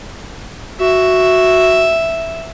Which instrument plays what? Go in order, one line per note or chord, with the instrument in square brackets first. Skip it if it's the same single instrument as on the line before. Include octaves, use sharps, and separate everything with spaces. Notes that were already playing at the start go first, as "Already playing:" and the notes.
[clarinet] F#4 [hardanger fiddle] E5